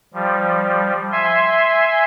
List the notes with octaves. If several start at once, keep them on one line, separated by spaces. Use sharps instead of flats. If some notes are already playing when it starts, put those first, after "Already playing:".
F3 G3
E5 G#5 C6